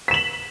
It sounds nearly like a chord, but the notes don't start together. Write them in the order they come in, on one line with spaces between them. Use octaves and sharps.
B6 E7 F#7